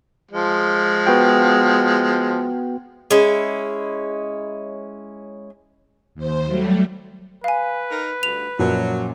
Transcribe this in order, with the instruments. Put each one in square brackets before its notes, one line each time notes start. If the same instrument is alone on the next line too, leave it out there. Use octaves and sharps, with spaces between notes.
[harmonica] F3 G#3
[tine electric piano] B3 F#4 G5
[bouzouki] G#3 C#4 E4
[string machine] D#2 C5
F#3 G3 A3
[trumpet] B4 [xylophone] F5 G#5
[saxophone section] D#4 A#4
[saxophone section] D2 G2 D3 [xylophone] F7
[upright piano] F#2 A#2 F3 [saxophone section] F#3